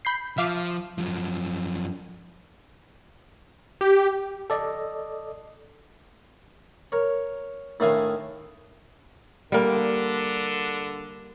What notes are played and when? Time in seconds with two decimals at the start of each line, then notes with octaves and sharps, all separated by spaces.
0.05 B5 G6 C7
0.38 F3 E5 F5 D6
0.98 F#2 F3
3.81 G4
4.50 A4 D5 D#5
6.92 A#4 C#5
7.80 A2 D#3 A3 D4 F5 G#5
9.52 D3 G3 A#3